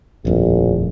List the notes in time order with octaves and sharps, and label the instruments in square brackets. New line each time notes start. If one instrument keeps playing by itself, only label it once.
[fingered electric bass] D#1 F2 A2 [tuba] A#1